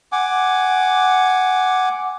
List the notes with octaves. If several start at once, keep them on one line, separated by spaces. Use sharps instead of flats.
F#5 G#5 D6